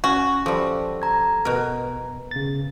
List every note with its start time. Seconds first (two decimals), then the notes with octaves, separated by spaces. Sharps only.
0.04 C#4 F#4
0.46 F3 G3 A4 D6
1.02 A#5 G#6
1.45 B2 A#4
2.31 C#3 A6